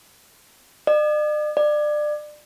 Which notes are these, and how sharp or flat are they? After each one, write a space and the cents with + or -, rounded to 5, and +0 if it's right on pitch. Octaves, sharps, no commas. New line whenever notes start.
D5 +45
D5 +25